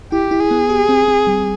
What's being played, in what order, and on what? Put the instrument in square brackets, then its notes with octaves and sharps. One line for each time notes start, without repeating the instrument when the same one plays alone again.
[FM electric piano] E4 [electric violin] G4
[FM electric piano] E4
[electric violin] G#4
[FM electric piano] B3
G4
C4
C4
G3